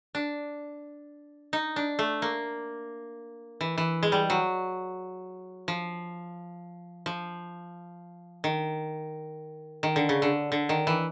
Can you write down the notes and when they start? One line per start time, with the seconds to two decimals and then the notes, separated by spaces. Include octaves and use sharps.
0.15 D4
1.53 D#4
1.76 D4
1.99 A3
2.22 A#3
3.61 E3
3.78 E3
4.03 G#3
4.12 G3
4.30 F#3
5.68 F3
7.06 F3
8.44 D#3
9.83 D#3
9.96 D3
10.09 C#3
10.22 D3
10.52 D3
10.69 D#3
10.87 E3